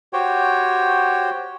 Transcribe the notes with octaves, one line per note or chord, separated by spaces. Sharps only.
F#4 G4 C5 C#5 G5